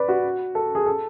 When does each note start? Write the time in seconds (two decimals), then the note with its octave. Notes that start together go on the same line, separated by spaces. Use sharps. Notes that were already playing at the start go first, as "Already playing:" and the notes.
Already playing: B4 D5
0.08 F#4
0.55 A4
0.75 G#4
0.86 A4